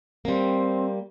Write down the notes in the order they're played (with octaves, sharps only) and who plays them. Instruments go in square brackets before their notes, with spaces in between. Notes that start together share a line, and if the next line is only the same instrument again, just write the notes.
[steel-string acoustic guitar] G3 A#3 [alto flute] C4